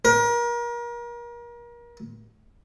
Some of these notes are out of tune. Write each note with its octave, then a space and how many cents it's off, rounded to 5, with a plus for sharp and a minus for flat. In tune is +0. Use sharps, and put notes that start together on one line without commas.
A#4 +35